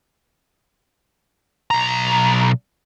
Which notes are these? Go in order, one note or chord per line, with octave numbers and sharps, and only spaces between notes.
B1 A#5